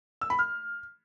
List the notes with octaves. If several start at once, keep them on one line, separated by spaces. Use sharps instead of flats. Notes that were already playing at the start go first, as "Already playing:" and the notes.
E6
B5
F6